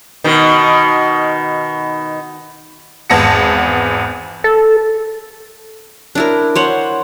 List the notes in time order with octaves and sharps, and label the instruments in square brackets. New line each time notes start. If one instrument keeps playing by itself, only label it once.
[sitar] B2 D#3
[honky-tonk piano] G#1 E2 B3 A5 A#6 C#7
[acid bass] A4
[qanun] D4 E4 A#4
C5 C#5 F#5